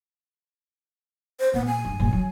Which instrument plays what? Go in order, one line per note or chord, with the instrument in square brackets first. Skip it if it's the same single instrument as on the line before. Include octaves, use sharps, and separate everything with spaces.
[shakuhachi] C5
[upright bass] A#2 [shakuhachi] B3
[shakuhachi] G#5
[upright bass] G2
G2 A#2
F#3